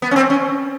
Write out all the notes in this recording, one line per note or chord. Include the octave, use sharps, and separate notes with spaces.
B3
C#4
C4
C#4